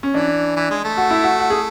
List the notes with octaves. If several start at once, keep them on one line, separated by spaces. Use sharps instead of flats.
C#4
E3 D4
E3
G#3
A3
F#4
E4
F#4
F#4
G#4